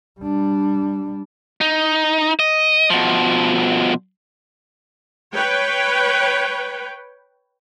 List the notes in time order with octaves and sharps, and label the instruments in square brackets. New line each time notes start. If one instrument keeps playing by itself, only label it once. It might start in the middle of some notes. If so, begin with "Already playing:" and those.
[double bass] G3 D4
[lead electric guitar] D#4
D#5
B2 F3
[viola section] B4 C#5 G5